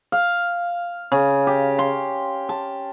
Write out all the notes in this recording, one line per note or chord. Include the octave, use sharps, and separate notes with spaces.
F5
C#3
G4
C6
A5